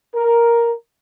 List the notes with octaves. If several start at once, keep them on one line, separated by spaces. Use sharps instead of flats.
A#4